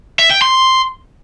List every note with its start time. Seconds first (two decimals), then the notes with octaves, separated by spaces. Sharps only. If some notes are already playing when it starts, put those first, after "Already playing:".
0.19 E5
0.30 G5
0.42 C6